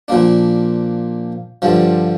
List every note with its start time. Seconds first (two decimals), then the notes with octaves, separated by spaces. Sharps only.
0.08 A#2 F3 A#3 D4
1.62 G2 D3 F3